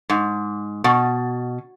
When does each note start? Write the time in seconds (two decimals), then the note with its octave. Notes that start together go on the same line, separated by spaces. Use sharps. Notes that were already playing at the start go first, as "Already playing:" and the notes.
0.10 G#2
0.84 B2